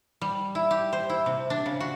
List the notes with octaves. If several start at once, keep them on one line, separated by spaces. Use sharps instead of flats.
G3
E4
G4
C5
E4
C3
D4
C#3
F#4